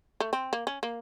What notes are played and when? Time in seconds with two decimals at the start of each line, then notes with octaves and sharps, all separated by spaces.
0.20 A3
0.33 C4
0.53 A#3
0.67 C#4
0.83 A#3